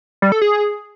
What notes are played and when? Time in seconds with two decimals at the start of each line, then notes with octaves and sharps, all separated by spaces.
0.22 G3
0.32 A4
0.42 G#4